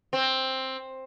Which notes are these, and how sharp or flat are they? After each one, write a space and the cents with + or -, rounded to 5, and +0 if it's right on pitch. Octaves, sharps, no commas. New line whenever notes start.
C4 +10